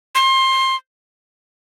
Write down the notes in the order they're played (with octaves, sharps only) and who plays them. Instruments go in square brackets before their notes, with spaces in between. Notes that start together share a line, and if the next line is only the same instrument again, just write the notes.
[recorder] C6